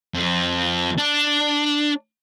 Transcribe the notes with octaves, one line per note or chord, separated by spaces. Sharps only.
F2
D4